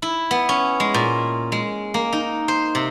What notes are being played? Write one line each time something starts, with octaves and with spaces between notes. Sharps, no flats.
E4
B3
C#4
G#3
A#2
G#3
A#3
D#4
C5
C3